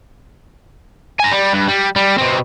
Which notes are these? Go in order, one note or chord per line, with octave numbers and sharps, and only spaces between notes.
G#5 A#5
G3
G2
G3
G3
B2 C4